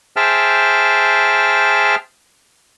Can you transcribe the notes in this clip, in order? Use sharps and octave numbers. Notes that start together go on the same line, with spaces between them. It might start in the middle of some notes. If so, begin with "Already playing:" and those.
G#4 C5 E5 G5 A5 F6